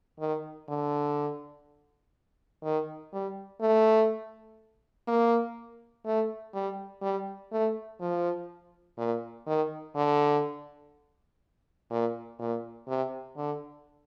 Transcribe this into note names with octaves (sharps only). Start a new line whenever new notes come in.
D#3
D3
D#3
G3
A3
A#3
A3
G3
G3
A3
F3
A#2
D#3
D3
A#2
A#2
C3
D3